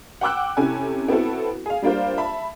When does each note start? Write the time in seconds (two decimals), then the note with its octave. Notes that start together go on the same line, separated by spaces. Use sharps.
0.21 F#5 G5 D6 E6 F#6
0.57 C3 C#4 E4 A4 G#5
1.08 B3 C4 E4 F#4 A4
1.66 G#4 F5
1.82 G3 A#3 D4 F4 C5
2.17 E5 A5 B5